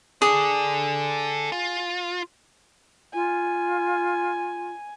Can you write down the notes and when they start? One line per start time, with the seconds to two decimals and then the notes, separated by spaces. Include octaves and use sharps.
0.22 G#4 A4 D5
1.52 F4
3.14 F4 G#5